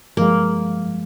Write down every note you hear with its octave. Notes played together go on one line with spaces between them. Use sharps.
G2 F3 G#3 A#3